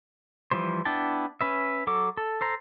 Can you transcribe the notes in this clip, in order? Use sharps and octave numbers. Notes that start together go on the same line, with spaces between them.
E3 F3 G3 C5
B3 D4 E4 G5 A5
C#4 B4 E5
F#3 A4 D6
A4
A4 C5 A#5